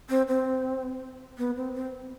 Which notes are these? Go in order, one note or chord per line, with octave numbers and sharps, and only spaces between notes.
C4
C4
B3
C4
C4